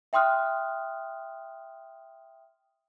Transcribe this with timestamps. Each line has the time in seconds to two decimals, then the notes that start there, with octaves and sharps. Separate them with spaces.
0.13 E5 G5 C6 D#6 F6 F#6